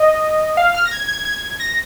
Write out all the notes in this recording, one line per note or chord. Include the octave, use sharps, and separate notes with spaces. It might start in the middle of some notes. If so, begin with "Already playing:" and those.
Already playing: D#5
F5
F6
A#6
G#6
G#6
G#6
A#6